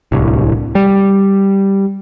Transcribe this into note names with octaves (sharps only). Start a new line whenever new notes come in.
D1 C2
G3